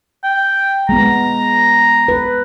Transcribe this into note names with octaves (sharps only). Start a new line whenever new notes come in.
G5
G#3 B3 A#5
B4